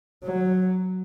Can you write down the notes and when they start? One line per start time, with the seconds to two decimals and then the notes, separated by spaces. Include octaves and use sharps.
0.23 F#3